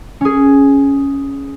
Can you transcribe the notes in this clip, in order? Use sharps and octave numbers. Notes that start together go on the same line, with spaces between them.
C#4 G#4